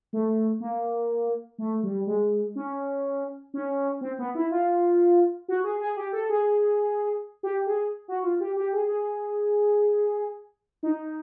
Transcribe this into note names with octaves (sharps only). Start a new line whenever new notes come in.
A3
A#3
A3
G3
G#3
C#4
C#4
C4
B3
E4
F4
F#4
G#4
G#4
G4
A4
G#4
G4
G#4
F#4
F4
G4
G4
G#4
G#4
D#4